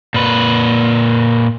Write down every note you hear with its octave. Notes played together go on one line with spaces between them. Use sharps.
A#2 B4